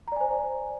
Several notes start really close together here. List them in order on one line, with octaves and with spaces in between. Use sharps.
A#5 D5 G#5 C5